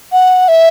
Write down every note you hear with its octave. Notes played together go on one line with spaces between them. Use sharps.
F#5
E5